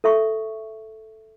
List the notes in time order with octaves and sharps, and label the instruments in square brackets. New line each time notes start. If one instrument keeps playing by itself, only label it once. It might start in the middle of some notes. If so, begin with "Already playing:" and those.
[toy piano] A4 E5 C#6